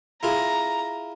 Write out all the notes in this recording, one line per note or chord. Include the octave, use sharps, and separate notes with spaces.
E4 F4 G#4 A#5